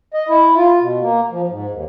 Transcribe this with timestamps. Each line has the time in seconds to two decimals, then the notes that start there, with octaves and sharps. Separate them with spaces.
0.14 D#5
0.29 E4
0.56 F4
0.80 B2
1.01 A#3
1.31 F3
1.48 G#2
1.70 D#2